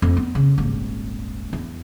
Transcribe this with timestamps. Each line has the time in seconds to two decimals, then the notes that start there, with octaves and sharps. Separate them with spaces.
0.02 F2
0.17 B3
0.35 C#3
0.58 D#1 G#1
1.53 E2